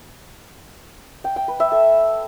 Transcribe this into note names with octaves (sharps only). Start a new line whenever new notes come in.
G5
G5
B4
E5
A4